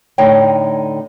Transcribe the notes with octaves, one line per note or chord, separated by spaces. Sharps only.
A2 D3 D#4 C#5 G5